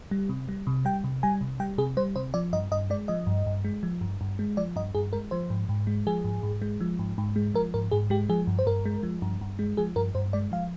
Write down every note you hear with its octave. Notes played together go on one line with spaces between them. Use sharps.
G3
C3
G3
C3
G3 G5
C3
G3 G#5
C3
G3 G5
C3 G#4
G3 C5
C3 C5
F3 D5
G2 D#5
G2 D#5
G#3 D5
F3 D#5
G2
G2
G#3
F3
G2
G2
G#3
F3 D5
G2 D#5
G2 G#4
G#3 A#4
F3 C5
G#2
G#2
G#3
F3 G#4
G#2
G#2
G#3
F3
G#2
G#2
G#3
F3 A#4
G#2 A#4
G#2 G#4
G#3 G4
F3 G#4
G2
C5
G2 A#4
G#3
F3
G2
G2
G#3
F3 G#4
G2 A#4
G2 C5
G#3 D5
F3 F5